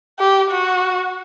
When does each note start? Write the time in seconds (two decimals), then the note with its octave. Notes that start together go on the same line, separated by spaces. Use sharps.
0.19 G4
0.50 F#4